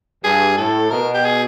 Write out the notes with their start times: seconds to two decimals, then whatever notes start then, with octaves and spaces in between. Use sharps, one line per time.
0.24 G2 G#4
0.58 A2 A4
0.91 B2 A#4
1.14 G4
1.25 G#4